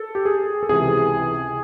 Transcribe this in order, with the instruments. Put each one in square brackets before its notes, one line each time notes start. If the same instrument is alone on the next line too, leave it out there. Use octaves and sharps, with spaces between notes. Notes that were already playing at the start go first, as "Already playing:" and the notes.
Already playing: [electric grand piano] A4
G4
G#4
A4
C#2 C3 E3 G#4